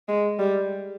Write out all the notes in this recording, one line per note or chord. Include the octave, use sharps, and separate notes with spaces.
G#3
G3